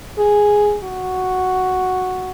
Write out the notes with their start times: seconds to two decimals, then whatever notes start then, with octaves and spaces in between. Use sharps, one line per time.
0.18 G#4
0.84 F#4